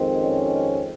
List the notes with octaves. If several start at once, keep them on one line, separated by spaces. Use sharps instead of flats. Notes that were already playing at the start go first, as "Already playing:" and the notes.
Already playing: F2 D#3 G#3 C4
C#4